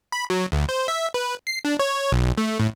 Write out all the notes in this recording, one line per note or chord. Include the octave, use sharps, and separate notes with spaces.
B5
F#3
D2
C5
E5
B4
C7
D4
C#5
B1
A3
A2